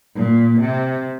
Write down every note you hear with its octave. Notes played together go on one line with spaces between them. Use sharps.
A#2
C3